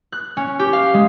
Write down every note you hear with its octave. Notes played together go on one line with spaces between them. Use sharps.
F#6
C#4
G4
F5
G#3